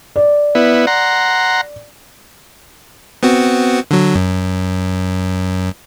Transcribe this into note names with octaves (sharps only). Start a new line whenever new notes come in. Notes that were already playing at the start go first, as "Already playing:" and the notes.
D5
B3 E4
F#5 A#5 C6
B3 C4 F#4
D3 F#3
F#2